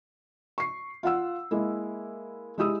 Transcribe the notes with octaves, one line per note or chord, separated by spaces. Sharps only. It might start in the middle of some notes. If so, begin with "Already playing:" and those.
C#6 C7
F4 F5 F#5 E6
G#3 A#3 E4
G#3 E4 G4 D#6 E6